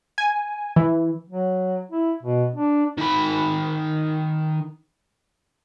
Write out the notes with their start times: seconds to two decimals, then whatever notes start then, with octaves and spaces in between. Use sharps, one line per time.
0.18 G#5
0.76 E3
1.30 F#3
1.91 E4
2.23 B2
2.55 D4
2.98 D#3 B5